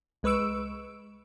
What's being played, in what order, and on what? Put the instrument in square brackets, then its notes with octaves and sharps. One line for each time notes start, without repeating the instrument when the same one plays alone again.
[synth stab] C2 G#3 B4 C#6 E6 D7